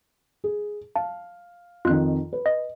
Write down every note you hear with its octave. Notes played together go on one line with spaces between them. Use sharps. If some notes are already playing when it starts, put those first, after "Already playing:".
G#4
F5 A5
F2 D#3 F4 F#6
B4
D#5